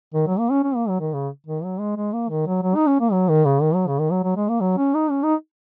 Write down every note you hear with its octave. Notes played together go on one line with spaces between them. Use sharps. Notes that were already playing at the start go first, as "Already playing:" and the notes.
D#3
F#3
A#3
C#4
C#4
A#3
F#3
D#3
C#3
D#3
F#3
G#3
G#3
A#3
D#3
F#3
F#3
D#4
C#4
A#3
F#3
D#3
C#3
D#3
F#3
C#3
D#3
F#3
F#3
G#3
A#3
F#3
C#4
D#4
C#4
D#4